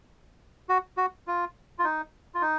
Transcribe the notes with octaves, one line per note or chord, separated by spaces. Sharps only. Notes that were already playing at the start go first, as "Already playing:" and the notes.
F#4
F#4
F4
F4
D#4
F4
D#4